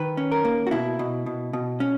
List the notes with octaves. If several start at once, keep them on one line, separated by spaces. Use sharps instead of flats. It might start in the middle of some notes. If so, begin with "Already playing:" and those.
Already playing: D#3 B4
C#4
A#4
A#3
F#4
B2 E4
B2
B2
B2
C#4